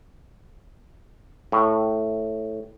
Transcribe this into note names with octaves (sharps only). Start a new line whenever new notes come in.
A2